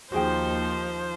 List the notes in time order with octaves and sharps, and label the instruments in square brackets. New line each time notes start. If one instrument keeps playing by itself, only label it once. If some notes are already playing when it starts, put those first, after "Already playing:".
[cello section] D#2 D#4 [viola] F3 C5 [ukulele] F#4 G#4 G5